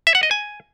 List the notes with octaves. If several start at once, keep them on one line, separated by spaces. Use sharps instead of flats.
E5
F#5
D#5
G#5